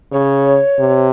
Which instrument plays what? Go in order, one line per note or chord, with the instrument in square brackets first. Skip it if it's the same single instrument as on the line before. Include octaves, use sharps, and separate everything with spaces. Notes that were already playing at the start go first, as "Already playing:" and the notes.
[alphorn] C#3 [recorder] C#5
[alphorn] C3